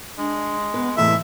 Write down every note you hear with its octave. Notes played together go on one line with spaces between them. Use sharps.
G#3 D4
B3 B4
E2 A2 C3 E3 G#3 E5